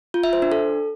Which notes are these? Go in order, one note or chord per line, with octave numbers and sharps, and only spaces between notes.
F4
E5
C5
D4
A4